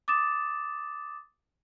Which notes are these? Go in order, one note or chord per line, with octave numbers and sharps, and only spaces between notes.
D6 D#6 A6 E7